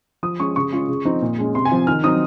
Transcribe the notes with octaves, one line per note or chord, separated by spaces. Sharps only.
F3 D#6
G#3 C#4 C#6
C#3 C#6
G#3 C#4 F4
C#3
F3 C4 D#4
A#2
G#3 C#4
C3 C6
G#5
F3 C4 F4
D#3 F6
F#3 C4 D#4 D#6